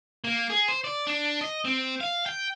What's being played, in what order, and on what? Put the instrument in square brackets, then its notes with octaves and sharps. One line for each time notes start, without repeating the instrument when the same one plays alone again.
[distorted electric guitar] A#3
G#4
C5
D5
D4
D#5
C4
F5
G5